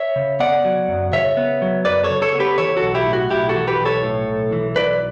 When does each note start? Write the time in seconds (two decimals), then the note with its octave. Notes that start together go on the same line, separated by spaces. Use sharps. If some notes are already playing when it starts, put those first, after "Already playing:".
Already playing: C#5 E5
0.16 C#3
0.40 B3 D5 F#5
0.65 F#3
0.89 F#2
1.12 C#3 C#5 E5
1.37 B3
1.62 F#3
1.85 F#2 B4 D5
2.04 A4 C#5
2.10 C#3
2.22 A4 C#5
2.35 B3
2.40 G4 B4
2.58 E3 A4 C#5
2.77 F#4 A4
2.83 B1
2.94 E4 G4
3.07 A2
3.13 F#4
3.30 B1 E4 G4
3.49 F#4 A4
3.55 E3
3.67 G4 B4
3.80 B1
3.85 A4 C#5
4.04 A2
4.28 B1
4.53 E3
4.76 B1 B4 D5